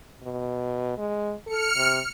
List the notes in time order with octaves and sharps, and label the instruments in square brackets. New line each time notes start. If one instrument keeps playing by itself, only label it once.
[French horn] B2
G#3
[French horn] A4 [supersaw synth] F6 C#7
[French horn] C3